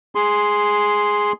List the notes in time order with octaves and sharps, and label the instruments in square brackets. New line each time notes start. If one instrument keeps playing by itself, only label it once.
[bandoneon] G#4 C6